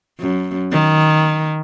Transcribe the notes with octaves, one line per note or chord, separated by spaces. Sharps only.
F#2
D#3